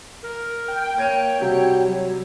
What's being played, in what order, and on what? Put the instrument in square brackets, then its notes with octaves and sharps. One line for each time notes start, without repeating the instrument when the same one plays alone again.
[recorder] A#4
[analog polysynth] G5
[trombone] A#3 [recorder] C#5 [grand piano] G#6 D7 D#7
[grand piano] C3 G3 [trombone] F#4
[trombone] F#3